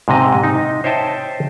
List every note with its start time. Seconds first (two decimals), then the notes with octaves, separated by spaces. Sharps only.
0.08 G#2 C3 D#5
0.44 D#4
0.84 C5 C#5 D#5 E5 G5 A5